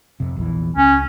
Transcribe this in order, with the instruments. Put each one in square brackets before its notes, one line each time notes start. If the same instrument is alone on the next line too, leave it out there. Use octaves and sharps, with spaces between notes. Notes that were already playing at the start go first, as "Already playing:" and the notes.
[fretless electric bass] F2 C3
A#1 E2 E3
[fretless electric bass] C#2 [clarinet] C#4